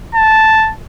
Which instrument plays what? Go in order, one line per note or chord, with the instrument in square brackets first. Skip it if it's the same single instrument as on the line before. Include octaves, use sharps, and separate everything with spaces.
[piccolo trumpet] A5